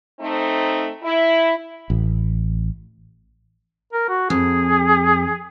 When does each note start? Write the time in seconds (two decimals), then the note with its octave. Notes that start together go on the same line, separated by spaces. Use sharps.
0.20 A3 C4 D#4
1.03 E4
1.90 A1
3.93 A#4
4.09 F#4
4.30 F2 G#4